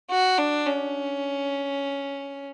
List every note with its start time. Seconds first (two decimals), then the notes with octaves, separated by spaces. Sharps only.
0.10 F#4
0.38 D4
0.67 C#4